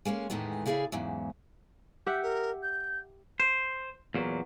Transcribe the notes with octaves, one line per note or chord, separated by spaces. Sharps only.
G#3 A#3 B3 C#4
E2 A2 D#3 E3 G#3 B3
C#3 E4 G#4 B4 D5 F5
E2 G#2 C#3 F#3
G4 E5 F#5 G6
A#4
G6
C5
E2 A#2 F#3